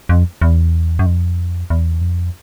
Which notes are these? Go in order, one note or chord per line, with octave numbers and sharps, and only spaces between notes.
F2
E2
F#2
F2
E2
F2